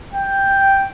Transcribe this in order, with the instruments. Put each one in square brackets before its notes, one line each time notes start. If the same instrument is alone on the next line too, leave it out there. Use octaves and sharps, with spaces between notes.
[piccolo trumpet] G5